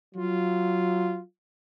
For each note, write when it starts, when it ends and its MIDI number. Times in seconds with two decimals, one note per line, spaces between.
0.15 1.20 54
0.15 1.20 65